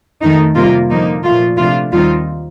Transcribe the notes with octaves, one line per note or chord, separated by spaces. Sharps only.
F2 D#3 A3 D#4
F2 C3 G3 A#3 F4
D3 F3 A#3 D#4
A#2 F3 A3 F4
C3 F3 A3 D4 F4
D#2 D#3 G3 C4 D#4 F4